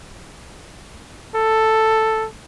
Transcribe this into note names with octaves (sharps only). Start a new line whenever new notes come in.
A4